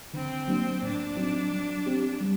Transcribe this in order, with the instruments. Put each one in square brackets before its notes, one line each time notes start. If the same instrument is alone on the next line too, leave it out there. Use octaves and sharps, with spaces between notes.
[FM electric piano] D3 [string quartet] C4
[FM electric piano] F#3 A#3 D4
[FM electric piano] A2 [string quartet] D4
[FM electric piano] F#3 C4 D#4
F#3
C4 G4
G3